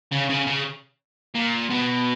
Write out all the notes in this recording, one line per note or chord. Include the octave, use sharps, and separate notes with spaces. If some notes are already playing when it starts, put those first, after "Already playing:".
C#3
C#3
C#3
A#2
B2